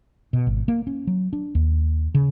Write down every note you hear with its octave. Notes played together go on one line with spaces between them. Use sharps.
B2
G#1
A#3
C#4
F#3
D4
D#2
C#3